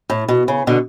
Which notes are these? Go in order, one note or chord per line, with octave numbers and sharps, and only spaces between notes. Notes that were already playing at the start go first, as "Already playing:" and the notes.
A2
B2
C#3
B2 D3